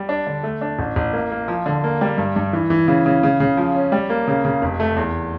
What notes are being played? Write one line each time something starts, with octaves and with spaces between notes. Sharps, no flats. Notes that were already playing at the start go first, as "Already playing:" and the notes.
Already playing: G3
D4
D3
A3
D4
A1
A1
A#3
A#3
F3
D3
A#3
G3
G2
G2
E3
E3
C#3
C#3
C#3
C#3
F3
C#4
G3
A#3
C#3
C#3
F1
A3
E2